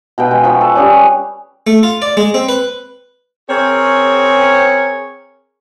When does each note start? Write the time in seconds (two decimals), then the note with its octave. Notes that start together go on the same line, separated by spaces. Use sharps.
0.18 B2 B4 G5
0.31 G#3
0.44 F3 B5 C#6
0.61 A4
0.75 G3 C#4 G4 G#4
1.67 A3
1.83 F4
2.02 D5
2.17 G#3
2.34 C4
2.49 B4
3.49 C4 G#4 A#4 C#5